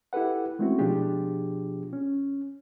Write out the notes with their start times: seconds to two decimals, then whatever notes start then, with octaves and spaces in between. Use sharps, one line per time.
0.13 E4 G4 A4 B4 F#5
0.59 G#3 A3 C4 C#4 E4 F#4
0.78 B2 F3 D4 F4 G4 G#4
1.93 C#4